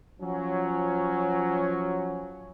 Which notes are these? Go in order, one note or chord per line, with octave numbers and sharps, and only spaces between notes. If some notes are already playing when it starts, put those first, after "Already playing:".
F3 F#3 C#4